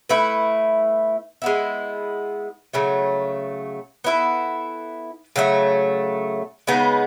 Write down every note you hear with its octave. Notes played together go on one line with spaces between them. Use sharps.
A3 E4 B4
G#3 B3 E4
C#3 F#3 A3
B3 E4 A4
C#3 F#3 A3
C#3 G#3 B3 D#4